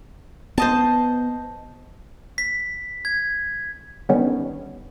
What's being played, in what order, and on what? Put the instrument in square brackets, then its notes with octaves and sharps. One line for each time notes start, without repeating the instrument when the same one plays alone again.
[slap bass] B3 [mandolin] C5 D#5 A5
[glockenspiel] B6
G#6
[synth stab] D3 D#3 G3 B3 C#4